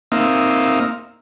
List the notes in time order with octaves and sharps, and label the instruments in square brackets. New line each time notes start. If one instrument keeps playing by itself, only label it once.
[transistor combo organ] A#3 C4 D#4 E5 F5